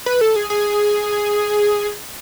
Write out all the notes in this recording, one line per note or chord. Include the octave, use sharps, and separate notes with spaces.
B4
A4
G#4
G#4